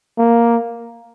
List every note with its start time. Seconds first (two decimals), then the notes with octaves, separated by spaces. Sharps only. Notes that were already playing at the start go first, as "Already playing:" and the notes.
0.18 A#3